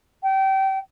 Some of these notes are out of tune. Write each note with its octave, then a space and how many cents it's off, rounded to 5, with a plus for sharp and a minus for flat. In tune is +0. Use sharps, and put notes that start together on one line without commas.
G5 -25